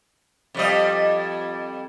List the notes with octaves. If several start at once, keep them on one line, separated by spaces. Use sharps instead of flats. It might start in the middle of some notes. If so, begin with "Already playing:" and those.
F2 G3 D#5